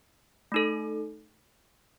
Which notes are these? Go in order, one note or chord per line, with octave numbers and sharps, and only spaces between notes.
A3 D#4 A4